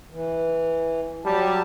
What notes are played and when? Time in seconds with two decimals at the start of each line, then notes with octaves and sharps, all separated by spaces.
0.12 E3
1.25 F#3 G3 G4 A5